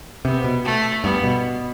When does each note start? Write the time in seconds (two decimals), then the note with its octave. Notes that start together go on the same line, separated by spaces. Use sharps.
0.25 C3 B3
0.44 B2
0.65 A3
1.03 G2 B3
1.24 B2